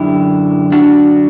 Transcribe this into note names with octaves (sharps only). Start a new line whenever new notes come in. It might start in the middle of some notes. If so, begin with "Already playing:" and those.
Already playing: F#2 D3 E4 G4
D4 F#4